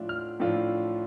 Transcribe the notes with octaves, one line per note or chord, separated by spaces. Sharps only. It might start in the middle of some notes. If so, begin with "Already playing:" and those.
Already playing: A2 F3 A3 D4 F4
F6
A2 F3 A3 D4 F4